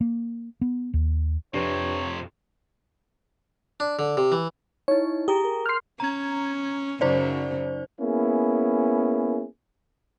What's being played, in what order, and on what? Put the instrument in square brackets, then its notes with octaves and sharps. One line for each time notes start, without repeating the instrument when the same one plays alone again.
[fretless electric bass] A#3
B3
D#2
[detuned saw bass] F2 [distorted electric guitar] C3 F3 [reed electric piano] D4 G4 B4 [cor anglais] C#5
[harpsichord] D4
D3
C3
E3
[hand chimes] D#4 E4 [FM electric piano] C#5
[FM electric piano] G4 [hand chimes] G#4 A#5 D#6
[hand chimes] A#4
[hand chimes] C6 G6 [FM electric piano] F6 C7
[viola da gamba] C#4 [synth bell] A#5 G#6
[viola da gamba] F#2 C#3 F#3 [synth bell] D#4 C5 D5
[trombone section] A#3 B3 C#4 E4 G#4